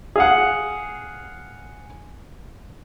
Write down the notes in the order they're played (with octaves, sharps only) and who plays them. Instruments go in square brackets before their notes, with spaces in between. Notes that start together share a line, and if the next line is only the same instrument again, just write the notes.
[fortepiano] G#4 F5 F#5